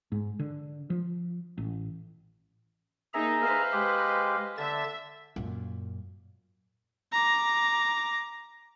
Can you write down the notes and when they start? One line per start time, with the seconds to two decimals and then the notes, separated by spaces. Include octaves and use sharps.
0.12 G#2
0.39 D3
0.90 F3
1.58 A1
3.14 A#3 D#4 G#4 D#5 E5 A#5
3.43 B4 C5 D#5 F5
3.73 G#3 G4
4.58 D3 E5 A6
5.36 F#2 A#2
7.13 A#5 D6